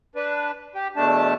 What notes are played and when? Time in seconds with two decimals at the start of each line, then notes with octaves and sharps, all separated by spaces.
0.15 D4 B4
0.75 G4
0.96 E2 B2 A3 D4 A5